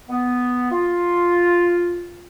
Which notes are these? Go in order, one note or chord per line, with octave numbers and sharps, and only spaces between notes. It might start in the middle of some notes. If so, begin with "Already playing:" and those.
B3
F4